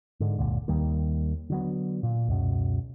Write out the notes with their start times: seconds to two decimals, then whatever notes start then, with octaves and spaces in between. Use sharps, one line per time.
0.20 G#2 D3
0.38 F#1 C#2 A#2 D3
0.68 D#2 D#3 G3 A#3
1.50 D3 F#3 B3
2.03 A#2
2.28 C#2 F#2 B2